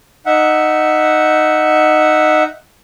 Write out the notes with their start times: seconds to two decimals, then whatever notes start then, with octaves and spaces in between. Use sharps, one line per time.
0.26 D#4 E5 F#5